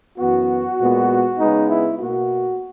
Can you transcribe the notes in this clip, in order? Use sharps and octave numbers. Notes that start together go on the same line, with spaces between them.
F#2 E3 B3 F#4
A#2 G#3 B3
C#3 G#3 B3 D#4
E4
B2 A#3 F#4